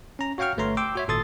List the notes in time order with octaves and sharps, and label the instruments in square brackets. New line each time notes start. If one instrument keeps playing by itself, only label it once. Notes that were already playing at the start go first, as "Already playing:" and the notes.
[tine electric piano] C#4 A#5
F#4 C#5 F5 G5 C#6 F6
G1 A3 B4 C#5 A#5 C6
G5 C6 D6 E6
F#4 C#5 E5
G#1 A#2 A4 C6 D#6 A6